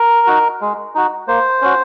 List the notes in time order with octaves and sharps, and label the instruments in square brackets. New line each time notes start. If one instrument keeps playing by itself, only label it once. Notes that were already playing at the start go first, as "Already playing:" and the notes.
Already playing: [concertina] A#4
D#4 F#4
G#3
D#4 F#4
A#3 C5
C#4 F#4